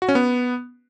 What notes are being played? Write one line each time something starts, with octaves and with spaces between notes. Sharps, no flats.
F#4
C#4
B3